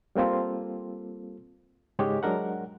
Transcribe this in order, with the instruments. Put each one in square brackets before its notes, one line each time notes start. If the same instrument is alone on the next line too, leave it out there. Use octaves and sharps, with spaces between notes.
[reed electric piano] G3 A#3 C4 F4 A4
G#2 C#3 G#3 G4 C#5
F#3 G#3 D4 A#4 F#5